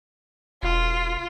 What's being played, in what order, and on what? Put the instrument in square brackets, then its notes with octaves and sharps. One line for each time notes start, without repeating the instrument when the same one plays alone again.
[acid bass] E1 [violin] F4